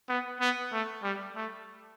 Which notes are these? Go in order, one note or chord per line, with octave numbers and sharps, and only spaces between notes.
B3
B3
A3
G3
A3